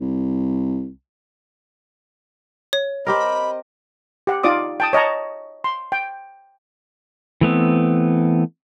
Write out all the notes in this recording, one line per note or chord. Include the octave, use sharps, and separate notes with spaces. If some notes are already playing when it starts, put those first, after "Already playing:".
C2
C#5
C4 G4 A#4 D#5 B5
G4 F#5
D#4 F4 D5 D6 D#6
G5 A5 D#6
C#5 D#5 A5 A#5
C6
G5
E3 A3 B3 C4